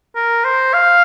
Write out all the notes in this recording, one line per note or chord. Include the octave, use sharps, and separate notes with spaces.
A#4
C5
F5